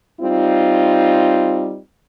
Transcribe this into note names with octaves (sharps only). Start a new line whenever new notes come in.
G3 C4 D#4 F4